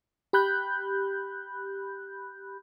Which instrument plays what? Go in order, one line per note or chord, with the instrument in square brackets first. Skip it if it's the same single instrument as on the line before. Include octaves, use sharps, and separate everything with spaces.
[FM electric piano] G4 B5 F#6 G6